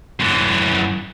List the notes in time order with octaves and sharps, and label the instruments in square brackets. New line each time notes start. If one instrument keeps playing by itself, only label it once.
[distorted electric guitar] F#2 E3